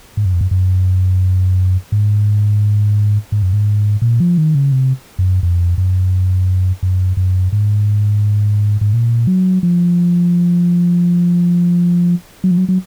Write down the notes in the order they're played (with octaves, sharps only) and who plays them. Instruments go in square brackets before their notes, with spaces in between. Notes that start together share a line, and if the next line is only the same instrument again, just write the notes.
[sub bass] G#2
F#2
F2
F#2
F#2
G#2
G#2
F#2
G#2
A#2
F3
D#3
C#3
C3
F#2
F2
F#2
F#2
F#2
G#2
G#2
A#2
F#3
F3
F#3
F3
F#3
F#3